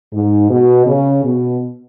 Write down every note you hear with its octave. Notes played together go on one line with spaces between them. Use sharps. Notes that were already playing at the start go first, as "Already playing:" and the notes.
G#2
B2
C#3
B2